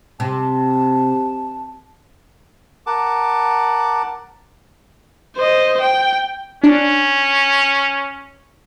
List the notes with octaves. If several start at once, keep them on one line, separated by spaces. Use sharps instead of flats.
C3 A5
A#4 F#5 A5 D6
C5 D#5
G5
C#4 D4